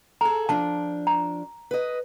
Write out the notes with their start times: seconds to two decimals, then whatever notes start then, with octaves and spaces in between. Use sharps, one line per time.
0.21 G#4 A4 A#5
0.49 F3 D4 A5
1.07 A#5
1.71 B4 D#5